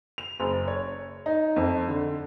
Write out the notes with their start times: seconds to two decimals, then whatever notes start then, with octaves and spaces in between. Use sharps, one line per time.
0.18 F7
0.40 F#1
0.68 C#5
1.26 D#4
1.56 F2
1.88 D3